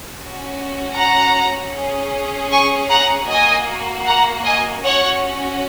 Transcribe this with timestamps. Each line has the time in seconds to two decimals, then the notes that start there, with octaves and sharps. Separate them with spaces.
0.19 C#4 F#4
0.97 F#5 A#5
1.74 C#4 G#4
2.51 G#5 C#6
2.90 F#5 A#5
3.28 A#3 F#4 D#5 G#5
4.06 F#5 A#5
4.44 D#5 G#5
4.83 C#4 F#4 C#5 F#5